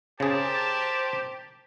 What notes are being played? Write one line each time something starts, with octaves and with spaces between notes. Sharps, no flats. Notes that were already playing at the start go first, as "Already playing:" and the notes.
C#3 G4 G#4 A#4 C5 D5 A5